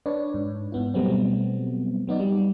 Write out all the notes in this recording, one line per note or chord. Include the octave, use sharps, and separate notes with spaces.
D4 B4 C#5 D5
G#2
G#2 B3 E4
B2 F#3 G3 A3 B3 C4
F#3 B3 D#4 D5
G3